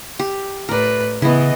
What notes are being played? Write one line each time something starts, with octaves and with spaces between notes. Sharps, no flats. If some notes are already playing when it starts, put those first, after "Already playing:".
G4
A2 A#4 B4 D5
C#3 E3 B3 E4 D#5